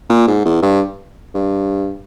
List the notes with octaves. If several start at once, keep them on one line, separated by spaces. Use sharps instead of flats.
A#2
G#2
E2
G2
G2